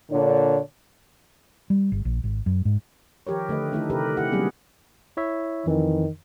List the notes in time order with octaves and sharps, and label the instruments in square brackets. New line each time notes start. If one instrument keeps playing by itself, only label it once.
[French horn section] A#2 D3 D4 C#5
[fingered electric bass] G3
G1
A#1
G#1
F#2
G#2
[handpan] D#3 F3 G4 A#4 C#5
D3 A3 B4 D#5
D#3 A3 D#4 E4 A4
C3 D#3 G4 A#4 B4
E4 G4 F#5
F#3 G3 A#3 B3 C#4 G#4
[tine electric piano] E4 C#5 E5
[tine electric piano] F2 E3 [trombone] D#3